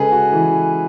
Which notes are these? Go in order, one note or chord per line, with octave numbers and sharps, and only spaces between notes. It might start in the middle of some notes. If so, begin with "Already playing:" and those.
Already playing: C#3 G#3 G#4 A4 B4
F#4
E3